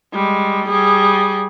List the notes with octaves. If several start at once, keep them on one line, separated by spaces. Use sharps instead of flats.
G3 G#3
G3 G#4